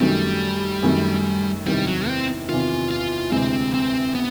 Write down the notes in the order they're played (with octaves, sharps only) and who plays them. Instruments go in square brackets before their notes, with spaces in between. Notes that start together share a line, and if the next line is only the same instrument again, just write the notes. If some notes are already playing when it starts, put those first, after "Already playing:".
[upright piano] F#2 D#3 F#3 A3 [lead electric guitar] G3
[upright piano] F#2 D#3 F#3 A3
[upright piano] E2 C3 D#3 [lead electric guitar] G3
[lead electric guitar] F#3
C4
[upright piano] E2 C3 D#3 [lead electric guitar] F4
[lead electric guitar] F4
[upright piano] D2 C3 E3 G#3 [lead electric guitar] C4
[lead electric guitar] C4
B3